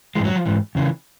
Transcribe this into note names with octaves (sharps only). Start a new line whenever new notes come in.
G#2 E3 G#3
F#3
F3
G#2 E3
E2 C#3 E3